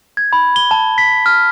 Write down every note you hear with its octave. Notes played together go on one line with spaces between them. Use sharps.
G#6
B5
G7
A5
B6
F6